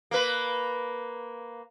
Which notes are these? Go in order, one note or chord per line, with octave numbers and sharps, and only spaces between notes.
A#3 B4